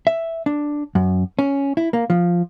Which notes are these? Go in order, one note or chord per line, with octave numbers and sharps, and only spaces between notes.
E5
D4
F#2
C#4
E4
A#3
F3